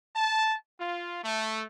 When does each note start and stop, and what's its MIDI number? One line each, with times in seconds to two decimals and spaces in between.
0.15 0.55 81
0.79 1.20 65
1.23 1.64 57